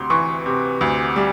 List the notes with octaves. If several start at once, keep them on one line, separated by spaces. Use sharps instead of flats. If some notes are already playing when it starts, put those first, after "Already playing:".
Already playing: D2 C3 C6
E3 C#6
C3
D2
G3